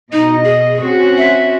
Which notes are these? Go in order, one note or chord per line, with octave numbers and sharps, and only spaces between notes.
B2 D#4 D#5
G#4
C4 C#4 F#4
E5